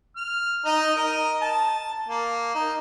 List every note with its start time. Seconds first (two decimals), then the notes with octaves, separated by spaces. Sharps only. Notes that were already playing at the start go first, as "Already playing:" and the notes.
0.17 F6
0.65 D#4 D#5
0.96 A#4 D#5
1.42 A5
2.09 A#3
2.55 D#4